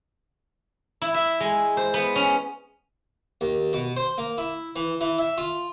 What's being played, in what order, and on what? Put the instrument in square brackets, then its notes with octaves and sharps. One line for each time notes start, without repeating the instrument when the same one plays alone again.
[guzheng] E4
E5
G#3
C5
B3
C#4
[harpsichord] D#2
B2
C5
A#3
E4
E3
E3
E5
F4